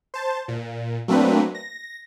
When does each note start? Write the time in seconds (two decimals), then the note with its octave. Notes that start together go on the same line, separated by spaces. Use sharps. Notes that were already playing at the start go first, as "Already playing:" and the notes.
0.14 C5 A5
0.48 A#2
1.08 F#3 A3 A#3 C4 D4 B4
1.55 A#6